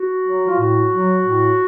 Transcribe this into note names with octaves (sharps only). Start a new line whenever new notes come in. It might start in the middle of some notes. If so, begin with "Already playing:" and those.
Already playing: F#4
F#3
F4
A2 F#4
F#3
A2